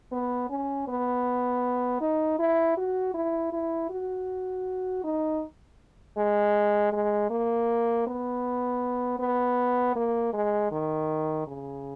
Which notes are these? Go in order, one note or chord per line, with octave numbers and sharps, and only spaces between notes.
B3
C#4
B3
D#4
E4
F#4
E4
E4
F#4
D#4
G#3
G#3
A#3
B3
B3
A#3
G#3
D#3
C#3